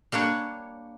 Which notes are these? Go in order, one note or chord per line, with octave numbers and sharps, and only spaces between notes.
G3 A#3 D4 C#5